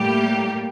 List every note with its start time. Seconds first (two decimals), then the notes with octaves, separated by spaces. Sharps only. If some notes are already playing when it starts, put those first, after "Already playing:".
Already playing: A2 G3 A#3 G4